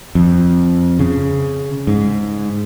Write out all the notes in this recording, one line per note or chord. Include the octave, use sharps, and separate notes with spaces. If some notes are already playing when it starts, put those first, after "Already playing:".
F2
C#3
G#2